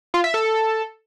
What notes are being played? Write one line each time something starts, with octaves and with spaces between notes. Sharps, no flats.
F4
E5
A4